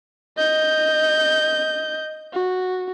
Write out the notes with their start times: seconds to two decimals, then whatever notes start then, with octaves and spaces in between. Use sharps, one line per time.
0.37 D#5 G6
2.33 F#4